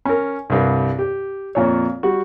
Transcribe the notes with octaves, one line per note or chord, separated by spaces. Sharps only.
C#4 A#4
C2 G2
G4
F2 A#2 C#5
G3 F#4